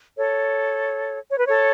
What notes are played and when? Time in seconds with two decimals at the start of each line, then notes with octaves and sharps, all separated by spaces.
0.16 A4 C#5
1.29 C#5
1.38 B4
1.47 A4 C#5